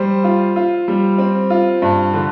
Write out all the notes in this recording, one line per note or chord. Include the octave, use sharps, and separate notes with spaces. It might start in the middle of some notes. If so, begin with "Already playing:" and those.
Already playing: G3 C5
F4
F4
G3
C4
F4
G2
D3